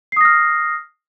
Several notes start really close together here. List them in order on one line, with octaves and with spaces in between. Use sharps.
C7 D#6 A#6 F6